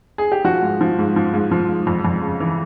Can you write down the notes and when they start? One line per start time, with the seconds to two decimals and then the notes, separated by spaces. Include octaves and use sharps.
0.18 G#4
0.32 G4
0.44 F3 F#4
0.62 G#2
0.81 F3
0.99 G#2
1.16 F3
1.34 G#2
1.51 F3
1.69 G#2
1.87 F2
2.05 F2
2.22 C#3
2.40 E3